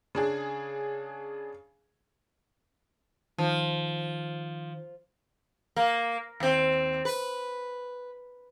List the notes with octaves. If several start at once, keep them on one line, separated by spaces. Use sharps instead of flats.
C#3 D4 G#4
D#3 F3
A#3
D#2 C4
B4